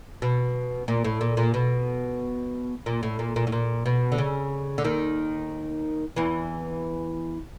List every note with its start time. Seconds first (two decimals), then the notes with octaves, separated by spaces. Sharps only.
0.22 B2
0.88 A#2
1.05 A2
1.21 A#2
1.37 A#2
1.54 B2
2.86 A#2
3.03 A2
3.19 A#2
3.36 A#2
3.47 A2
3.52 A#2
3.86 B2
4.12 D3
4.18 C#3
4.78 D3
4.84 D#2 D#3
6.16 E2 E3